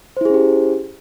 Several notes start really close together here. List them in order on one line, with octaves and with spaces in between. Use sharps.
C5 E4 G#4 C#4 G4